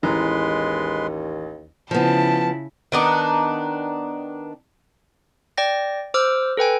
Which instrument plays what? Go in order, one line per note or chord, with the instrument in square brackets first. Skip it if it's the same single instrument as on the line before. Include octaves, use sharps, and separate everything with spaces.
[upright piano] A1 E3 A#5 [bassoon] D#2 [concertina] G#3 B4 C6
[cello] C#3 E4 [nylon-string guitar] F3 B3 [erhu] A5
[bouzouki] D#3 B3 D4 D#4
[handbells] D5 G5 A#6
C5 D6 E6 F6
A4 B4 G5 G#5